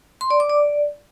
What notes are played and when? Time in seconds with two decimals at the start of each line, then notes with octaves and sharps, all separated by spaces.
0.21 C6
0.30 D5
0.40 D6
0.49 D5